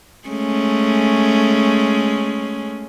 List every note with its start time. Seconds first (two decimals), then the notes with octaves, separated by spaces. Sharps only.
0.28 G#3 A3 C#4